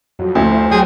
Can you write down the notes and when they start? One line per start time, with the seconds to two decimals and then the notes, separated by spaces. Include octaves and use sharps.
0.19 F2 F#3
0.35 D2 E4 C5
0.71 F#3 G3 G#4 C5 G5